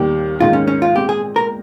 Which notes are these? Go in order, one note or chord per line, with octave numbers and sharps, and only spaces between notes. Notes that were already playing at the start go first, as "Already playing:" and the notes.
Already playing: D#2 D#3 G3 A#3 G4
G#2 D#3 A#3 D#4 F4 G#4
C#4
C#4
F4
A#2 G#3 C4 G4
G#4
A#4